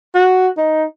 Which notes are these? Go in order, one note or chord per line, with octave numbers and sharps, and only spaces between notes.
F#4
D#4